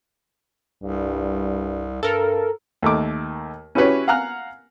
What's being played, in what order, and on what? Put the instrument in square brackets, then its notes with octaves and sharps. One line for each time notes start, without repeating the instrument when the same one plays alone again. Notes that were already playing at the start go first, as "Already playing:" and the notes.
[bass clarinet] C2 [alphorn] G2
[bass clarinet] G2 [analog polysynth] A4 A#4
[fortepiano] D#2 A3 D#4 D6
C#4 E4 F#4 G4 B4 C#5
F5 F#5 G#5 A#5 F6 F#6